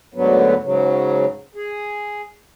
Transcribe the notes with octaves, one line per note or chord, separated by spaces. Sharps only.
D2 G#2 D3 F#3 B3
G#2 C#3 F#3
G#4